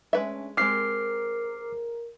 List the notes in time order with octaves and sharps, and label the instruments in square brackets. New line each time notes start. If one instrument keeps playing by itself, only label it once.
[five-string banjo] G#3 B4 E5 [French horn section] A3 C#4 D4
[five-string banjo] G#3 C4 G4 [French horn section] A#4 [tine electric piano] D6 F6 C7